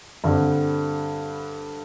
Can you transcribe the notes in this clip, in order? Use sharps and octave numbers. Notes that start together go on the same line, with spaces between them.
G2 D3 G3 C4